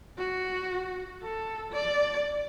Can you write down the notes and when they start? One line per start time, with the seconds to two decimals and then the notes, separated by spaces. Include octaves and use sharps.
0.18 F#4
1.22 A4
1.72 D5